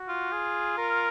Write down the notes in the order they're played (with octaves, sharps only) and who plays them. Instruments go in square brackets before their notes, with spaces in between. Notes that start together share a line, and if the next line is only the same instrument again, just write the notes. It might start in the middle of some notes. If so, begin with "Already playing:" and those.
Already playing: [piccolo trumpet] F#4
[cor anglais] F4
[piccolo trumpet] G#4
A#4